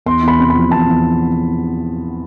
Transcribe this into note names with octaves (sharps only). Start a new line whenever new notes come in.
E2 C6
E2 B5
C3 C6
B5
F3
E2 A5
E2